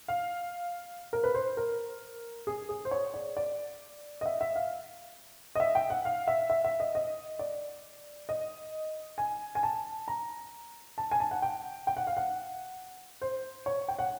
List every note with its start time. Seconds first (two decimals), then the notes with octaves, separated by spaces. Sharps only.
0.08 F5
1.13 A#4
1.24 B4
1.35 C5
1.57 A#4
2.47 G#4
2.69 G#4
2.85 C5
2.91 C#5
3.14 D5
3.37 D5
4.21 D#5
4.26 E5
4.41 E5
4.56 F5
5.55 D#5
5.60 E5
5.75 G5
5.90 F#5
6.05 F5
6.28 E5
6.50 E5
6.65 E5
6.80 D#5
6.95 D#5
7.39 D5
8.29 D#5
9.18 G#5
9.55 G#5
9.63 A5
10.08 A#5
10.98 A5
11.11 G#5
11.20 A5
11.31 F#5
11.42 G5
11.87 G5
11.97 F#5
12.07 F5
12.17 F#5
13.22 C5
13.66 C#5
13.88 G5
13.99 F#5